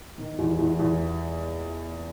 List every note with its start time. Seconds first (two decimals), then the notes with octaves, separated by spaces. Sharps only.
0.18 D#3
0.38 E2
0.58 E2
0.79 E2